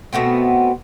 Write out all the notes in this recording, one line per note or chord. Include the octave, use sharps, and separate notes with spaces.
B2 A3 B3 C4